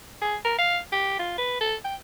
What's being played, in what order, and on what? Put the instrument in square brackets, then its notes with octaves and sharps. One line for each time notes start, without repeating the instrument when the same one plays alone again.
[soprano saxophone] G#4
A#4
F5
G4
F4
B4
A4
G5